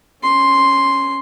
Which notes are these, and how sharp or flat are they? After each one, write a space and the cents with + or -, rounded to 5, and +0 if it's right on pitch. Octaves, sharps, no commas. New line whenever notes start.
C#4 +0 C6 +0